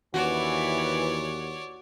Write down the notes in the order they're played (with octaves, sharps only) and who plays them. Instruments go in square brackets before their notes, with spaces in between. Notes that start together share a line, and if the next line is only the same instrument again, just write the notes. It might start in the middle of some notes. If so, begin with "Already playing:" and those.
[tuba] D#2 [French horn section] E3 [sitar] F#4 [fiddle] C#5 D5